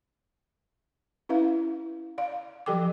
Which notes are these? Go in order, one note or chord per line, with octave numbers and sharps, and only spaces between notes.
C#4 E4 B4 E5 F5
D5 F5
F3 F#3 G4 A4 G5 D6